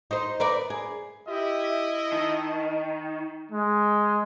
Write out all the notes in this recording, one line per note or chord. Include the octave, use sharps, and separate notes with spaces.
D#4 C5
A#4 B4 D5
G#4
E4 G4 D#5 E5
D#3 A5
G#3